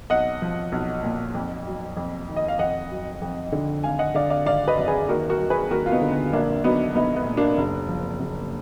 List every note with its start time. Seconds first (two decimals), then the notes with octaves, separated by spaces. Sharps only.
0.10 B1 D#5 F#5
0.42 F3
0.72 B1
1.03 A#2
1.34 F2
1.66 F#3
1.97 F2
2.28 D#3
2.36 D#5
2.48 F5
2.59 F2 D#5 F#5
2.91 F#3
3.22 F2
3.52 D3
3.84 G#1 F5 G#5
3.99 D#5 F#5
4.15 D3 D5 F5
4.30 D5 F5
4.46 G#1 D5 F5
4.68 B4 D#5
4.77 F#2
4.88 G#4 B4
5.09 D#2 F#4 A#4
5.29 F#4 A#4
5.39 F#3
5.50 G#4 B4
5.70 D#2 F#4 A#4
5.86 F4
5.92 B3 D#4
6.01 D3
6.12 B3
6.33 A#1 A#3 D4
6.64 F#3 B3 D#4
6.95 A#1 B3 D#4
7.16 B3
7.26 A#2
7.37 A#3 D4
7.57 F#1
7.89 F3
8.20 F#1